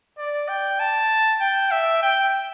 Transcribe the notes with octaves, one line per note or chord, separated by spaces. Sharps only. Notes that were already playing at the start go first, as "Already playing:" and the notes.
D5
G5
A5
G5
E5
G5